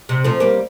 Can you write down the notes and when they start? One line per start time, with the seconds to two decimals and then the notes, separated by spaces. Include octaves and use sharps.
0.09 C3
0.24 F3 A3
0.40 G3 A#3